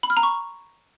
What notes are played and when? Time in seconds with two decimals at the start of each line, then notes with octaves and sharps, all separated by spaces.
0.03 B5
0.10 F6
0.17 A#5
0.23 C#6